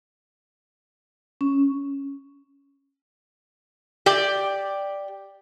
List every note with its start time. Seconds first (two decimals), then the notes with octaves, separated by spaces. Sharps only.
1.41 C#4
4.06 G4 D5